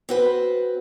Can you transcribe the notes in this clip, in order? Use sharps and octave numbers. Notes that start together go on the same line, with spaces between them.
C4 F#4 B4